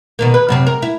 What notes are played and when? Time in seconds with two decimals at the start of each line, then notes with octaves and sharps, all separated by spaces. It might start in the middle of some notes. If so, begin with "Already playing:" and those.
0.19 B2 D#3 A#3
0.34 B4
0.48 F#2 C3 C4
0.67 A#4
0.82 E4